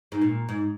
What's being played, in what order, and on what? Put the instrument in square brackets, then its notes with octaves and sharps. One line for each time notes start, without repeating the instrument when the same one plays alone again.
[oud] G#2
A#2
G#2